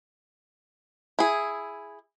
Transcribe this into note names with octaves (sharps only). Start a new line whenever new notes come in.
E4 G#4